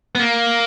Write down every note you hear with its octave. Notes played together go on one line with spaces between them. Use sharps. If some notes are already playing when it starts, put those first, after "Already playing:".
B3
A#3